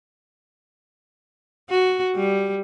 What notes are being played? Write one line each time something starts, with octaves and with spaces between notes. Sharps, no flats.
F#4
G3